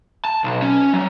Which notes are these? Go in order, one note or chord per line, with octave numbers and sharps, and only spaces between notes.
A5
B1
C#4
F#3